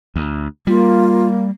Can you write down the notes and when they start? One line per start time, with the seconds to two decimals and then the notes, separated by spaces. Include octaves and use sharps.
0.16 D2
0.67 G3 A#3 F4